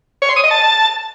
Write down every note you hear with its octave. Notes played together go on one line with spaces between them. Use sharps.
C#5
C6
D#6
D#5
A5